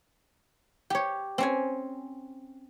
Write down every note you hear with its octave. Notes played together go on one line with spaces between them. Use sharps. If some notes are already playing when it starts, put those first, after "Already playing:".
G4 C#5
C4 C#4 G#5